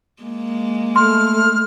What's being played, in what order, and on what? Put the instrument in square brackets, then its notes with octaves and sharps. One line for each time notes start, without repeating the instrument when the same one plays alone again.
[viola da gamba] G#3 A#3
[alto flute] A3 [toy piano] C6 [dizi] F6